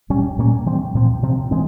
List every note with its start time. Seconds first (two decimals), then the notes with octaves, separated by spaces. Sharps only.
0.10 A#2 G3 C#4
0.38 A#2 G3 A#3 C#4
0.66 E3 G3 C4
0.94 A#2 F3 C4
1.23 C3 F3 C4
1.51 E3 G#3 C4